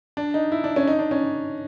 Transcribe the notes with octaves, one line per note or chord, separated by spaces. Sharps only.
D4
D#4
E4
D4
C#4
D#4
D4
C#4